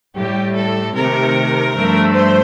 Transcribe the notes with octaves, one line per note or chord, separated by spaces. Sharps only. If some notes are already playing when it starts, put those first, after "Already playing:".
A2 G3 G4
A4
C3 D#3 A3 A#4
G2 F3 A3
C5